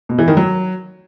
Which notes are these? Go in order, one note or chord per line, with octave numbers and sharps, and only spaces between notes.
B2
E3
D#3
F#3